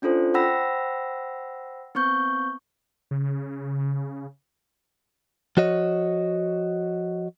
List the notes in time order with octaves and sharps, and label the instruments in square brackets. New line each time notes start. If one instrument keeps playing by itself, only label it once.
[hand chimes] C#4 D4 F4 A4 C5
C5 F#5 G5 B5 E6 A#6
B3 C4 C#6 G6
[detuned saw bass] C#3
[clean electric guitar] F3 F#4 C#5 D#5